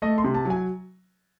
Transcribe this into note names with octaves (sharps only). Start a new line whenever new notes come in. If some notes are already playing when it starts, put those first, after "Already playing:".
A3 D#5
C6
C3
A5
F#3
G#5